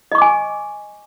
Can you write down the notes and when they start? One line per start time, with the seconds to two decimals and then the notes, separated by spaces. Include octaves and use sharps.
0.12 D#5
0.15 C#6
0.18 D6
0.22 G#5